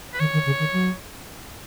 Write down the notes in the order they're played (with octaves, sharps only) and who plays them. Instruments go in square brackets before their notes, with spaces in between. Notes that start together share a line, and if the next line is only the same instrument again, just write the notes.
[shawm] B4
[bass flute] D#3 [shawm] C#5
[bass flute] D#3
C#3
D#3
F#3